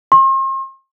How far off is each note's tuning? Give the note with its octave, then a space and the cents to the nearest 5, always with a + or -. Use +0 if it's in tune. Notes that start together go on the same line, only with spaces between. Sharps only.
C6 +40